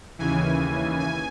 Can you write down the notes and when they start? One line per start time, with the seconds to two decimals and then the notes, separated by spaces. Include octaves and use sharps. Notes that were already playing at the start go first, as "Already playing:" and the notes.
0.19 D#2 C#3 E3 G#5
1.00 G#5